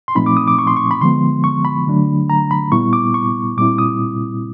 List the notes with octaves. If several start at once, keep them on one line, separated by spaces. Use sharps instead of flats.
C6
A#2 F3 A3 C4 D#4 B5
D6
D#6
D6
C#6
C6
C#6
B5
D3 F3 G#3 B3 C6
C#6
B5
D3 F#3 A3 D4
A#5
B5
A#2 G3 B3 E4 C#6
D6
C#6
A#2 G3 C4 E4 D6
D#6